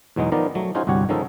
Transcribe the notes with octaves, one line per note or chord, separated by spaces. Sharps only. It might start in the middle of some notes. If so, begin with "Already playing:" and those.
E2 B2 F#3 G#3 D#4
D#3 F3 B3 D#4 A#4 D5
F#3 A3
C#4 D#4 F4 F#4 G#4 C5
G1 C2 F#4 G4 C#5 F#5
D#3 F3 G#3 C#4 D#4 A4